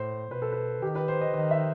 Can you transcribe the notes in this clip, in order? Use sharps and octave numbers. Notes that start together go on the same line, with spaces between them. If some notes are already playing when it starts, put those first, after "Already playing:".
Already playing: A2 C5
B2 B4
A4
B4
D#3 G4
B4
C5
D#5
D#3 D#5
E5